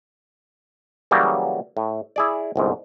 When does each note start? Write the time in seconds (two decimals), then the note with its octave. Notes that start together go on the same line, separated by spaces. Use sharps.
1.11 C#3 E3 F#3 G3 A#3
1.77 A2
2.16 E4 G#4 D5
2.56 G1 C2 G#2